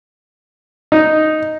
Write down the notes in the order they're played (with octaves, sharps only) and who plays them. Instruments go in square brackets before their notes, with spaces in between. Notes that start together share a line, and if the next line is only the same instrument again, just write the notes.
[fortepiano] D#4